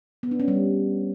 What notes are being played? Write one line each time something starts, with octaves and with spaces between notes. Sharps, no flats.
B3
D4
C#4
G3